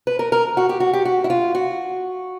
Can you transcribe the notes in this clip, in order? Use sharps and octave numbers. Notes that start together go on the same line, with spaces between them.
B4
A#4
A#4
F#4
G4
F#4
G4
F#4
E4
F4
F#4